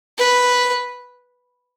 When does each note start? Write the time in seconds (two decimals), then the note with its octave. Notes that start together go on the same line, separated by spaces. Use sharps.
0.18 B4